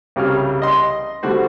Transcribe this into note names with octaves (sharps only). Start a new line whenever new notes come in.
C2 C#3 G3 F6
D#5 C6
D3 G3 A3 F#4 C5